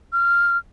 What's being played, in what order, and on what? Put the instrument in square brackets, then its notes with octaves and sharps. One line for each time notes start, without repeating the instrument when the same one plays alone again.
[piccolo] F6